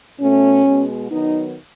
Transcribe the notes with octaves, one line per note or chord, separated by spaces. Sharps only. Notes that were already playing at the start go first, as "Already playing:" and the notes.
B2 A3 C#4
B2 G#3 B3
D#3 F#3 B3 D#4